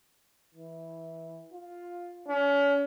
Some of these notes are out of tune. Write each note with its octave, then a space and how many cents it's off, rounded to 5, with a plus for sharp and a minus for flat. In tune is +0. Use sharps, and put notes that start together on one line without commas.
E3 -10
F4 +5
C#4 +35